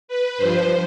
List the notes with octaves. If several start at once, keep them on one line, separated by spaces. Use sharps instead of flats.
B4
G2 F3 C5